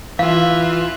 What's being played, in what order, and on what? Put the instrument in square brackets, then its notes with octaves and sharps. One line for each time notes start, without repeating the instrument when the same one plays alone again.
[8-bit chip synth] E3 F4 [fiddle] E5 F#6 [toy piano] F5